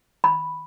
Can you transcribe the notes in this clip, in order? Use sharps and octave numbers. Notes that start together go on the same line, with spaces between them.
B5